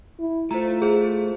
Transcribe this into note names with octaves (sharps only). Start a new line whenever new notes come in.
E4
A3 F4 C5 A#5
G#4 C5